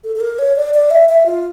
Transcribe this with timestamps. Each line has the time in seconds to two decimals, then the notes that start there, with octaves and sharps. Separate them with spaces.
0.04 A4
0.16 A4
0.21 A#4
0.39 C#5
0.56 D5
0.74 D5
0.90 E5
1.09 E5
1.26 F4